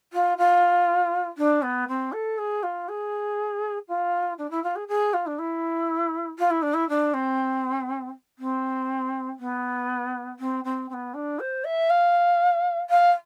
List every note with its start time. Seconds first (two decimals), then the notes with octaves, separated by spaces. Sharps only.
0.13 F4
0.38 F4
1.38 D4
1.62 B3
1.88 C4
2.12 A4
2.38 G#4
2.63 F4
2.88 G#4
3.88 F4
4.38 D4
4.51 E4
4.63 F4
4.76 G#4
4.88 G#4
5.13 F4
5.26 D4
5.38 E4
6.38 F4
6.50 E4
6.62 D4
6.74 E4
6.89 D4
7.14 C4
8.38 C4
9.39 B3
10.39 C4
10.64 C4
10.89 C4
10.93 B3
11.14 D4
11.39 C5
11.64 E5
11.90 F5
12.90 F5